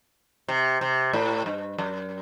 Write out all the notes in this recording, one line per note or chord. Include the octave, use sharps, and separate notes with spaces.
C3
C3
A2
G2
F#2